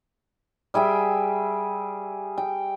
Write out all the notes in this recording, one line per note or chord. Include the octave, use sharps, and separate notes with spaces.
G3 G#4 E5 G5
G5